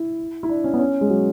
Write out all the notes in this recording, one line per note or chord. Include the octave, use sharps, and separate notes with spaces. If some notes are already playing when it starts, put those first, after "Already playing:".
Already playing: E4
E4
D4
C#4
B3
C#4
G#3
F#3